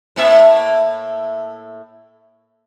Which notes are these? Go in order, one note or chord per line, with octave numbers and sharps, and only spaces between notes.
A2 A#3 E5